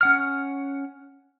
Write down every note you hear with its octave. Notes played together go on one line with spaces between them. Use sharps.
C#4 F#5 F6